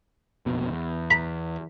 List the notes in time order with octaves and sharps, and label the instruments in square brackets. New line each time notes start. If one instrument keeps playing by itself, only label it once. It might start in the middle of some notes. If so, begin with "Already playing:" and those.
[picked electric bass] F1 A#1 B2
E2
[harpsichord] A#5 B5